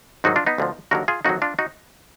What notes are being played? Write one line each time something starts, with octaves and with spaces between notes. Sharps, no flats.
G#2 D#3 F#3 D#4 F#4
D4 F4
B3 D#4
D2 D3 F3
D#2 D3 F#3 F#4 A#4
F4 G#4
F2 D#3 F#3 D#4 F#4
D4 F4
D#4 F#4